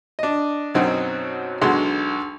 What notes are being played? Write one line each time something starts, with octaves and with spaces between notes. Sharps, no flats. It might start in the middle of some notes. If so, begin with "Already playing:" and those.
D4 D#5
F#2 B2 F#3 C4 D#4
B1 D3 G#3 F#4 C6